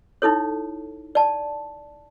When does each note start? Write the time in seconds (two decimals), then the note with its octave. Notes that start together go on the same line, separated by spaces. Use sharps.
0.22 D#4 E4 A4 C#5
1.15 D5 A5